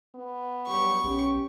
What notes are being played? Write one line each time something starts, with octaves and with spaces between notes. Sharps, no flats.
B3
G2 F#3 G4 C#6
B1 C#4 G4